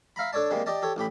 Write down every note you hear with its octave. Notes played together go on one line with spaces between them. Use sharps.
E5 F5 A#5 B5
D4 A4 C#5 D5 A5
C3 G3 G#3 A#3
G4 D5 D#5 A5
G4 A4 C#5
A1 A2 G4 B5